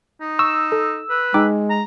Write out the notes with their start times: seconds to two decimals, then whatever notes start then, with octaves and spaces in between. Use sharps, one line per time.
0.21 D#4
0.39 C#6 E6
0.72 A4
1.10 B4
1.34 G#3 D#4 G5 D6
1.70 A#5